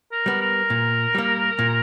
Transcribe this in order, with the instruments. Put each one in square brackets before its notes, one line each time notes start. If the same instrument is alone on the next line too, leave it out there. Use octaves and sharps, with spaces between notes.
[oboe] A#4
[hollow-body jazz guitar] G3 B3
[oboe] A#4
[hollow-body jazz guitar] A#2
G3 A#3
A#2